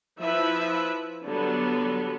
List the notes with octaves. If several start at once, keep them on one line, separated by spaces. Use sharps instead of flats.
F3 E4 B4 E5
D3 F#3 G3 B3